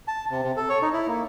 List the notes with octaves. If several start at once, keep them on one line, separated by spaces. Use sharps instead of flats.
A5
C3
C3
A4
C#5
D#4
E4
A#3